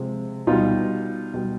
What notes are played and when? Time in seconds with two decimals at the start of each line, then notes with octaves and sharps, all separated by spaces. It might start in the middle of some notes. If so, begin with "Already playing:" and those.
Already playing: C3 F3 G#3
0.47 B2 G3 D#4 F4
1.34 B2 G3